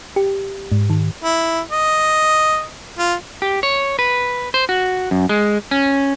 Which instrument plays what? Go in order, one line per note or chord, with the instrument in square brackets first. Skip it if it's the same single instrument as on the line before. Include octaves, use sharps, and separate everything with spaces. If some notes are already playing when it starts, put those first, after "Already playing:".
[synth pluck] G4
G#2
D#3
[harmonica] E4
D#5
F4
[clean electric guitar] G4
C#5
B4
C5
F#4
F#2
G#3
C#4